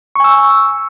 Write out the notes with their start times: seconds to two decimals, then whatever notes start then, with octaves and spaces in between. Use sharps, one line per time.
0.15 C#6
0.20 G#5
0.24 E6